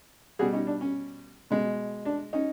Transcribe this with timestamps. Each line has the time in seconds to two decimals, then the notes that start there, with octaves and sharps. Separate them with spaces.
0.39 B2 G3 F#4 G#4
0.53 C#4 D#4
0.67 D4
0.81 C#4
1.50 B2 G#3
2.05 D4
2.33 C#4 D#4